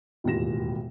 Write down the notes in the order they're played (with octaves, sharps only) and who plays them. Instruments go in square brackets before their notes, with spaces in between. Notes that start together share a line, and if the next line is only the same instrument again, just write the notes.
[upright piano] E1 D#2 A2 F4 A#6 E7